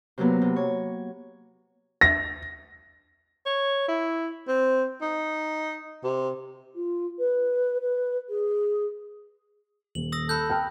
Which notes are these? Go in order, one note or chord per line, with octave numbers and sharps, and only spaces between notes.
C3 F#3 A#3 B3 A#4
C3
C#5
A#6
C#5
E4
C4
D#4
C3
F4
B4
B4
G#4
D#1 F#7
D#6 E6 A#6
A4 B5 F#6 G6
G5 A5 F6